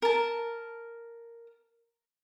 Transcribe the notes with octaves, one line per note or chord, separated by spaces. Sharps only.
A#4 A5